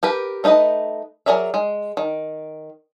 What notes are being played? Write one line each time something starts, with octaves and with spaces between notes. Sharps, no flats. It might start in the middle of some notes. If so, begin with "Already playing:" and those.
G4 A#4 B4
A3 D#4 A4 B4 D#5
F#3 G#4 A#4 D5 E5
G#3
D#3